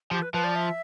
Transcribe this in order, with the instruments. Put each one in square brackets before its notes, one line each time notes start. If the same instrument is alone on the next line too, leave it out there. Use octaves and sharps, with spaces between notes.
[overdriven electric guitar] F3 [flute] G4
[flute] B4
[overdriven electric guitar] F3 [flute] B4
[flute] D5
E5